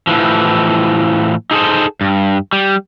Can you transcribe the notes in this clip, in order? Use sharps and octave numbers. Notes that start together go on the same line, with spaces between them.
A2 E3 F3
D#4 G#4 A4 C5
G2
G3